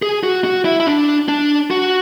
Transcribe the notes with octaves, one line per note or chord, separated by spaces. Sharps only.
G#4
F#4
F#4
E4
E4
D4
D4
F#4